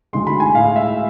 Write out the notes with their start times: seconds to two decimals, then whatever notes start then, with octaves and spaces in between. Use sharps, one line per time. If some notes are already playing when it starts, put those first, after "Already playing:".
0.13 D2 D3 G#3 C6
0.27 B5
0.40 G#5
0.55 A2 G#3 F5
0.76 E5